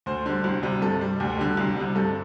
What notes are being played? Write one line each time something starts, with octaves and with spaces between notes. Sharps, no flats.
D2 C5
D3 G3
C2
C3 G3
G2 A4
G3
D2 G4
D3 G3
C2
C3 G3
G2 A4